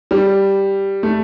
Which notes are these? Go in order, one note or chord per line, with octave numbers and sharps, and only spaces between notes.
G3
A3